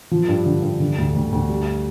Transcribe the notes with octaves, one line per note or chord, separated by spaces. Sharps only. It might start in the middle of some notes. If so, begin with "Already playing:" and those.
F3
G2
D3
G2
D3
D2
D2
D2
G3